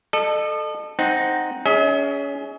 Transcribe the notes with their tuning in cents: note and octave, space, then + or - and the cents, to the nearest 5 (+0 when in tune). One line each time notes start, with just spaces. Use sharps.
A4 +0 D#5 -40
C4 +0 D#4 +0 F#5 +0
C#4 +25 G#4 +0 D#5 +45